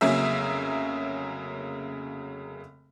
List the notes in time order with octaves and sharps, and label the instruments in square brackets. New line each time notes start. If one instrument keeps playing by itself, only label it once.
[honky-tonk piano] F1 C#3 F#3 A#3 G#4 E5